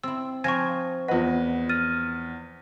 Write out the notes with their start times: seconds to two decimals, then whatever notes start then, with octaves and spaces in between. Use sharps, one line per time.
0.03 C4 E4 E6
0.44 F3 C4 D#4 G#5 C#6 G#6 A#6
1.08 E2 F4 B4 D#5 F#5
1.69 F6 A6 D#7